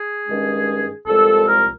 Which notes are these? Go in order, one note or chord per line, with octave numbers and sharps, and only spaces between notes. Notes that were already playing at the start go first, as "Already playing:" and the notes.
Already playing: G#4
G2 D#3 G#3 C#4
C2 A#2 F3 G#3 A4
A#4